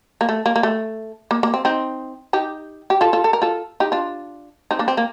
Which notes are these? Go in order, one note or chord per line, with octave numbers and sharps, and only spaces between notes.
A#3
A3
A#3
A#3
A3
A#3
A#3
C4
C4 D#4
D#4 G4
G4
F4 A4
F4 A4
A4
A#4
F4 A4
D#4 G4
D4 F4
C4 D#4
A#3 D4
C4
A#3